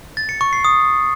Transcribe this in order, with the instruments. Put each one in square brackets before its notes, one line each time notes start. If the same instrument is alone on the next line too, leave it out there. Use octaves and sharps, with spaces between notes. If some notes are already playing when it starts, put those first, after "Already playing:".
[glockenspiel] A6
C#7
C#6
C7
D#6